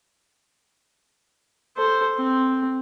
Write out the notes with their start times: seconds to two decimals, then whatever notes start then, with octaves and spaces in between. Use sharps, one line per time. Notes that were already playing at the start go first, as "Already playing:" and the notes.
1.77 A4 C5
2.18 C4